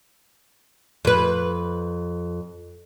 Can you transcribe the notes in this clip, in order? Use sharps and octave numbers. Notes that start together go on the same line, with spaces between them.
F2 B4